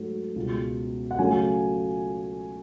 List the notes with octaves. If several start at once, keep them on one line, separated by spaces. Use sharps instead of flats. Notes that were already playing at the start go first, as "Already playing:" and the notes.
Already playing: G#2 F#3 A3
C#2 B2 G#3
F#5
C#3 F#3 A3 G#5